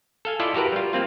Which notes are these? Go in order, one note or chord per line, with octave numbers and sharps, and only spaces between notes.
A4 F5 G#5
E4 F4 A4 D5 D#5
F#4 G4 A#4 B4
G3 F4
A#3 C4 F4